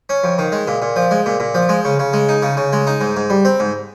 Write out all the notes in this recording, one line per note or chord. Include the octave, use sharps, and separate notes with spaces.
C#4
F2
D#3
G#3
A#2
A#2
F3
G#3
A#2
A#2
F3
G#3
C#3
C#3
G#3
D#4
C#3
C#3
G#3
D#4
G#2
G#2
G3
C4
G#2